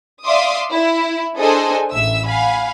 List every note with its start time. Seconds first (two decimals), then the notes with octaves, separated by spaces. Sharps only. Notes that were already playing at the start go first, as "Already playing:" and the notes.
0.23 D5 E5 F5 C6 D6 D#6
0.72 E4
1.37 D4 G#4 A4 C5 D#5 G#5
1.91 A1 E5 E6
2.26 F5 F#5 G#5 B5